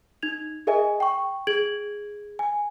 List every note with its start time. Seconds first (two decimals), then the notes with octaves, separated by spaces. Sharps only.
0.22 D#4 G#6 F7
0.67 G#4 A#4 D#5 E5 G#5
1.00 G5 C#6
1.47 G#4 G#6 D7 F#7
2.39 G#5